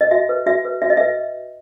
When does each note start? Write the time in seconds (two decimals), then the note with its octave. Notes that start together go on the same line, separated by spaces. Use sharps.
0.01 D#5
0.11 F#4 E5
0.29 B4
0.46 F#4 E5
0.65 B4
0.82 F#4 E5
0.90 D#5
0.97 B4 E5